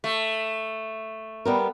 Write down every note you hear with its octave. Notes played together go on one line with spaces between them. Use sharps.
A3
G3 B3 A#4